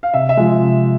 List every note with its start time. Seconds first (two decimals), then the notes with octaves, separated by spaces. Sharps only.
0.03 F5
0.14 C3 E5
0.29 E5
0.37 F3 G#3
0.60 C3